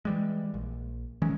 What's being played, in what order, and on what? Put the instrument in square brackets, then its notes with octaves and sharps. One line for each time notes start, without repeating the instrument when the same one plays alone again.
[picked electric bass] E3 G3 G#3
A#1
D#3 E3 G#3 C#4